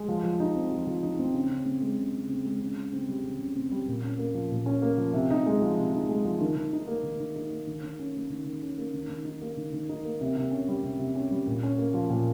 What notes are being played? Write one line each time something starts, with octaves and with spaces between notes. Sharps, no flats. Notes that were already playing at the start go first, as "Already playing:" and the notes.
Already playing: G#3
F3
F3
D#4
C4
F3
F3
D#4
C4
C#3
C#3
C4
G#3
C#3
C#3
C4
G#3
C#3
C#3
C4
G3
C#3
C#3
C4
G3
A#2
C#4
A#3
F3
A#2
C#4
A#3
F3
C3
D#4
G#3
F3
C3
D#4
G#3
F3
D#3
D#3
D#4
A#3
D#3
D#3
D#4
A#3
D#3
D#3
C#4
A#3
D#3
D#3
C#4
A#3
D#3
D#3
D#4
A#3
D#3
D#3
D#4
A#3
C3
C3
C#4
G3
C3
C3
C#4
G3
A#2
C#4
A#3
F3
A#2